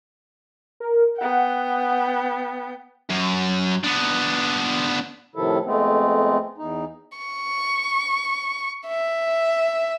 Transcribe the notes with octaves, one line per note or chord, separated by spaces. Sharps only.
A#4
B3 F#5 G5
F#2
B3 D4
A2 C3 D#3 F3 E4 A4
F2 G#3 A3 B3 C4
E2 D#4
C#6
E5